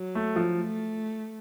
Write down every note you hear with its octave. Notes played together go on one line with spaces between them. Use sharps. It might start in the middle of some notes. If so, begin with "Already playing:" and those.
Already playing: F#3
A3
F3
A3